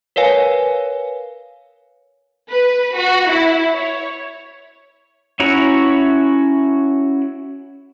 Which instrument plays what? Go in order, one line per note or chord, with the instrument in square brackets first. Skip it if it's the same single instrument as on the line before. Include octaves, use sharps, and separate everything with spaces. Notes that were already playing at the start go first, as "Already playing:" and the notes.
[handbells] A#4 B4 C#5 F5 G#5
[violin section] B4
F#4
E4
C#5
[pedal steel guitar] C#4 E4 F#4 C#5 A#5